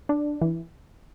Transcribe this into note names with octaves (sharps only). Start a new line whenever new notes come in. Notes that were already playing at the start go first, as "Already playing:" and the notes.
D4
E3